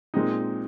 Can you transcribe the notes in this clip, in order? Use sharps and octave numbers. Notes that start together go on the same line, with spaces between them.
A#2 G#3 C4 D#4